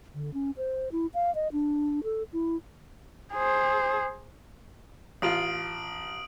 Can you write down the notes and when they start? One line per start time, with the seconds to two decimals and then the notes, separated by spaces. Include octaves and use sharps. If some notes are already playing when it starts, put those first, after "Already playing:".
0.15 D3
0.34 C#4
0.57 C5
0.92 E4
1.14 F5
1.35 D#5
1.52 D4
2.04 A4
2.33 E4
3.34 G#4 C5
5.22 A1 F4 D#6 D7 F#7